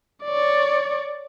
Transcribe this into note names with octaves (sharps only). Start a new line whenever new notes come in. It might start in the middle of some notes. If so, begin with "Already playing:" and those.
C#5 D5